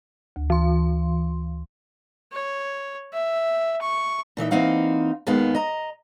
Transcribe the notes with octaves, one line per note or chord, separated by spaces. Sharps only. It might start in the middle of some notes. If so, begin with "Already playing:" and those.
D2
E3 C6
C#5
E5
C#6
A#2 E3 D#4 E5
E3 A#3 C4 D#4 F5 F#5
D#2 D#3 G#3 B3 F5
D#5 A#5